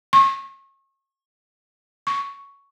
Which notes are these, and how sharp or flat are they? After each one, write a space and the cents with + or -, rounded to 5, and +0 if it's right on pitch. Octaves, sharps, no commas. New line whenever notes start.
C#6 -35
C#6 +5